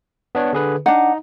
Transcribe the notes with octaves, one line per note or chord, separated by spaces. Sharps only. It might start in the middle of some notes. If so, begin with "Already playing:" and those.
B3 D4 C#5
D3 G#4 B4
D4 D#4 F#5